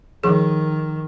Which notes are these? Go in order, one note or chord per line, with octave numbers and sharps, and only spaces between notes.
D#3 F3 G#4